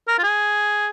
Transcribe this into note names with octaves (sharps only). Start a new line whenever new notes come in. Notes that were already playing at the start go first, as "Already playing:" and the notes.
A#4
F4
G#4